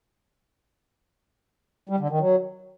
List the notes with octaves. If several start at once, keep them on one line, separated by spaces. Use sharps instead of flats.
G3
D3
D#3
F#3